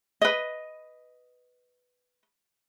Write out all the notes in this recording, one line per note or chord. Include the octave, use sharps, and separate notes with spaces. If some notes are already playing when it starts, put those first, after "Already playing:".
B4 D#5